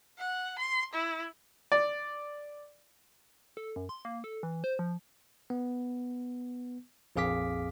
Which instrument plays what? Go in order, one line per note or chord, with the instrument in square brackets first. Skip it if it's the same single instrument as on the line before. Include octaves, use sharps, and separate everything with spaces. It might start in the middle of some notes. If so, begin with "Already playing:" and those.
[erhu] F#5
C6
E4
[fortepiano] D5
[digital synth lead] A4
F#2
C6
A#3
A4
E3
C5
F3
[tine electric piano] B3
A#1 F2 G#4 F5 D6 B6